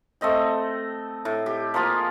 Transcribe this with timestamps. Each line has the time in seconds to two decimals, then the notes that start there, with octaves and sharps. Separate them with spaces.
0.21 A3 C4 D#5 G5
1.25 A2
1.46 G4
1.74 F3 A#3 F4 G#4